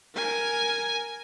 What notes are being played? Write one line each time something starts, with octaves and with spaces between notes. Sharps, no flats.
A#4 G#5